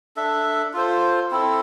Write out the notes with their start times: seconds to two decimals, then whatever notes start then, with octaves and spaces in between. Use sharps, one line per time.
0.17 D4 A4 E5
0.74 F4 A4 C5
1.31 C4 E4 A4